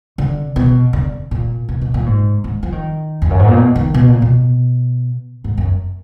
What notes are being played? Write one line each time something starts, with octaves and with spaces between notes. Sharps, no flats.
D3
B2
D3
A#2
B2
B2
A#2
G#2
G#2
F3
D#3
F2
F#2
G#2
A#2
B2
D#3
B2
A#2
B2
G#2
F#2